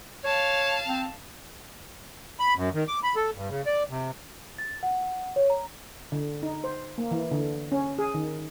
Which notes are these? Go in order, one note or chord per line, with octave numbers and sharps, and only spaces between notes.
C#5 F5 A5
C4
B5
F#2
D#3
D6
B5
A4
G2
C#3
D5
C3
A6
F#5
C#5
A#5
D3
D#4
C5
A#3
E3
D3
C#4
G#4
D#3